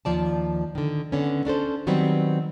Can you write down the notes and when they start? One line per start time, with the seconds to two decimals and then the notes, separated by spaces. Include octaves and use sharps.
0.05 D#2 F3 D5 A5
0.75 D3 D#3
1.12 D3 B3 C#4
1.45 C#4 D4 A4 C5
1.87 D#3 F#3 G3 B3 C4